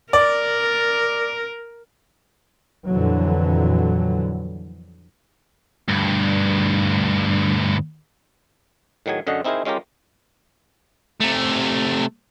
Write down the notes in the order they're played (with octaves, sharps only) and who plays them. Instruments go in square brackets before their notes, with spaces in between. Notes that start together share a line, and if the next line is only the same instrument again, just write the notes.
[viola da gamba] A#4 [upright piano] D5
[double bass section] F2 A#2 D3 E3 F#3
[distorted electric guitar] D2 G2
[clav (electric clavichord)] A2 D#3 F#3 G#4 G#5
F#2 D3 C#4 D#5 F#5
C4 D#4 E4 G#4 A#4 C5
G#3 C#4 F4 G4 A#4
[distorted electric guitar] C3 A3